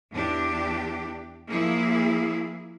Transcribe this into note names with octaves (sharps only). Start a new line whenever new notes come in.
E2 D4 G4
F3 A#3 E4 G#4